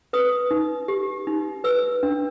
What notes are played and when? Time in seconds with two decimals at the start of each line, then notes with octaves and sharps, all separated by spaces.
0.13 B4 D#6
0.51 D#4
0.88 G4
1.27 D#4
1.64 B4 E6
2.03 D4